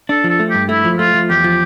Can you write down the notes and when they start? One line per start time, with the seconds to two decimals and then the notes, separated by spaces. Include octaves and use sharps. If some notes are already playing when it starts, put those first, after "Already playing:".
0.09 D4 A4
0.24 F3 A4
0.39 A3
0.50 G2 G4
0.69 A3 E4
0.84 F3
0.99 A3 F4
1.14 F3
1.30 E2 G4
1.44 F3